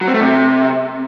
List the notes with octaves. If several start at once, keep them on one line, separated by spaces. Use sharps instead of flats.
F#3
C4
A3
C3